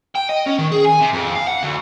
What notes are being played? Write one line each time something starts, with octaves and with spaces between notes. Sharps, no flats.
G5
D#5
C#4
D#3
G#4
G#5
C3
F2
F5
F#5
D2